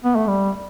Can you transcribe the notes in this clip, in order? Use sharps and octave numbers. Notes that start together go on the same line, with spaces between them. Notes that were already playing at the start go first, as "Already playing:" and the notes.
B3
A3
G3